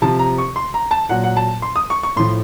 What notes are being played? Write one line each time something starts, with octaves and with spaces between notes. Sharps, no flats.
C3 F3 A5
A#5
C#6
C6
A#5
A5
A#2 F#3 F#5
F#5
A5
C6
D#6
C#6
C#6
A2 F3 C6